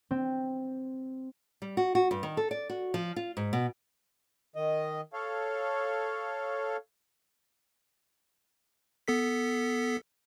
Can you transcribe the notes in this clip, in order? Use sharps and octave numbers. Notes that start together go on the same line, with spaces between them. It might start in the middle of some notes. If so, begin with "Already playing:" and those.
C4
G3
F#4
F#4
G2
D#3
A4
D5
F#4
F3
F4
G#2
B2
D#3 D#5
A4 C#5 F5
B3 A4 B6